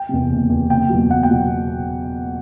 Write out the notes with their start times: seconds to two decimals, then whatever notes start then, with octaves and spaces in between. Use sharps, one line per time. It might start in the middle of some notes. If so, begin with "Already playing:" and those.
Already playing: G5
0.09 E2 C3
0.30 F#1
0.49 E2 C3
0.70 F#1 G5
0.89 E2 B2 F#3
1.10 F#1 F#5
1.23 G5
1.30 B2 F#3